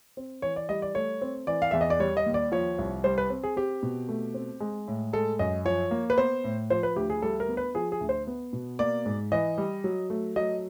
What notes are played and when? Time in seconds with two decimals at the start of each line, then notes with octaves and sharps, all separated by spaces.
0.17 C4
0.42 E3 C#5
0.56 D5
0.69 G3 D#5
0.82 D5
0.95 A3 C#5
1.21 C4
1.47 E3 D5
1.62 F5
1.71 E2 E5
1.81 D#5
1.90 D5
1.99 G3 C#5
2.17 D#5
2.26 D#2
2.34 D5
2.52 F3 C#5
2.78 C2
3.04 G3 C5
3.18 B4
3.30 C4
3.43 G#4
3.56 C4 G4
3.83 B2
4.09 A3
4.34 C4
4.60 G#3
4.88 A2
5.13 G#3 A4
5.39 F#2 D#5
5.65 F3 C#5
5.91 A#3
6.10 B4
6.18 B3 C5
6.44 A2
6.70 F3 C5
6.83 B4
6.96 D2 G4
7.10 G#4
7.22 G3 A4
7.40 A#4
7.48 B3
7.57 B4
7.75 F3 G#4
7.92 G#4
8.01 D2
8.09 C5
8.27 B3
8.53 B2
8.79 A#3 D5
9.06 G#2
9.32 E3 D#5
9.58 G3
9.84 F#3
10.10 A3
10.36 F#3 D#5